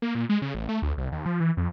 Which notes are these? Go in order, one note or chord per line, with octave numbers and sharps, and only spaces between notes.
A#3
A#2
G#3
C#3
A1
A3
D2
C2
D#2
F3
E3
F2